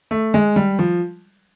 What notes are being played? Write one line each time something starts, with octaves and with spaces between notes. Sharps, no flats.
A3
G#3
G3
F3